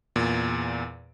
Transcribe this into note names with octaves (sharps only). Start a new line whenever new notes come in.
E2 A#2